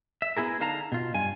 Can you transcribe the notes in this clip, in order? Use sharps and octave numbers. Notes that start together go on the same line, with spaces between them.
E5
B3 E4 G#4 A#4
D3 D#4 F5 A5 A#5
B2 F4
G2 G#5